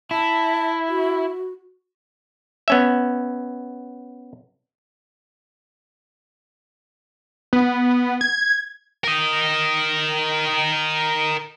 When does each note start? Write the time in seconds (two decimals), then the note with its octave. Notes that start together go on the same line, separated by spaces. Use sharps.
0.11 E4 A5
0.89 F#4
2.68 B3 C#4 E5
7.53 B3
8.21 G#6
9.04 A#4 D#5